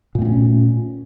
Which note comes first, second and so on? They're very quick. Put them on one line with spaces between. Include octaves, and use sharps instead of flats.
A#2 A3 C4 C#4